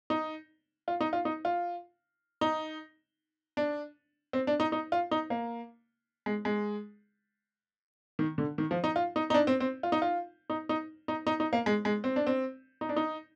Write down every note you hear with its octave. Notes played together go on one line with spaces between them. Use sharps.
D#4
F4
D#4
F4
D#4
F4
D#4
D4
C4
D4
D#4
D#4
F4
D#4
A#3
G#3
G#3
D#3
D3
D#3
F3
D#4
F4
D#4
D#4
D4
C4
C4
F4
D#4
F4
D#4
D#4
D#4
D#4
D#4
A#3
G#3
G#3
C4
D4
C4
D#4
D4
D#4